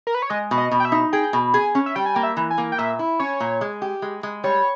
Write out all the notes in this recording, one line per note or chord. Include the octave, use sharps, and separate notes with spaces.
A#4
B4
C#5
G#3 D#5
B2
D#5
B2
G5
E5
D#4
G#4 G5
B2
G#4 G#5
C#4
E5
G3 G5
G#5
A#3 G5
E5
E3
G#5
A#3
G5
A#2 E5
E4
C#4 C#5
A#2
G#3
G4
G#3
G#3
G3 C#5